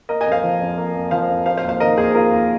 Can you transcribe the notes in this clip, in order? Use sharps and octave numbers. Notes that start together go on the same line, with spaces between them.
A#3 A#4 D#5
D#5 G#5
F2
C5 F5
F3
F2
A#3
F2
F3 C5 F5
F2
A#3 C5 F5
C5 F5
D#2
C5 F5
D#3 A#4 D#5
D#2 G#4 C5
A#3 F4 A#4
D#2